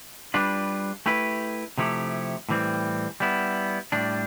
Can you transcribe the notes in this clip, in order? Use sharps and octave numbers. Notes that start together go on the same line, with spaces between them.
G3 D4 F4 B4
A3 E4 G4 B4
C3 F3 A3 E4 G4
A2 E3 G3 C4
G3 B3 E4
A2 G3 D4